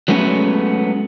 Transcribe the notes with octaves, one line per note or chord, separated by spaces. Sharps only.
F#3 G#3 A3 B3 C#4